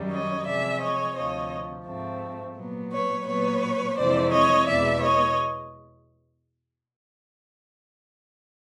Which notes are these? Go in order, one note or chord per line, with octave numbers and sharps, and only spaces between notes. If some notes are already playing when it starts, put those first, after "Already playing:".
Already playing: F#2 D#3 G3
C#5 D#5
C3 F3 G#3 D5 E5
C#5 D#5
D2 C3 F3 C#5 D#5
G#2 F3 A3 C4
A#2 F#3 B3
B4 C#5
A#2 F#3 B3 B4 C#5
F2 C3 E3 G#3 C4 C5 D5
C#5 D#5
E2 B2 G#3 B3 D5 E5
C#5 D#5